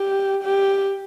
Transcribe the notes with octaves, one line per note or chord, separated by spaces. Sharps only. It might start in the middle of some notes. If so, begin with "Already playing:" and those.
Already playing: G4
G4